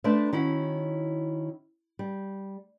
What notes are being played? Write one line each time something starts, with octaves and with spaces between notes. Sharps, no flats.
A3 D4 B4 C5 D5 E5
D#3 C#4 E4 F#4
G3